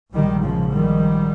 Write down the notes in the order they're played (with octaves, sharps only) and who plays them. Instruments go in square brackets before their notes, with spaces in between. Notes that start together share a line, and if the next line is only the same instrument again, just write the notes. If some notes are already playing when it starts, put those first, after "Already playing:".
[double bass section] A#1 G#2 D#3 G3
C#3 F3
D#3 G3